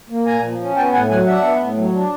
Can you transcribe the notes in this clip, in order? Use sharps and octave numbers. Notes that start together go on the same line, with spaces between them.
A#3
A#2 G#5 A#5
F3
C#4
B3 G5 A5
A2 F#5 G#5
F#3 F#5 G#5
D4 E5 F#5
B3
A2
F#3
D4